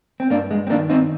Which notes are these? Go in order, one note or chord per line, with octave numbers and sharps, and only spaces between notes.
C4
G2 A#3 D4
G#3
C4
D#3 A#3 D4
C4 D#4